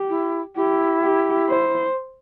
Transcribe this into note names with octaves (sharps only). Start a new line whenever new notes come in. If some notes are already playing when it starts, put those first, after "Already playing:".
Already playing: G4
E4
E4 G4
G4
C5